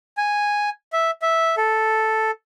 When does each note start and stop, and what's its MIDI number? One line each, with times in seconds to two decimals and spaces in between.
0.17 0.70 80
0.93 1.11 76
1.22 1.55 76
1.57 2.31 69